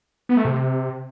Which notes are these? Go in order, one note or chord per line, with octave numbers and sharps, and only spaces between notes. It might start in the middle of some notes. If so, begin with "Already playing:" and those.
B3
A3
C3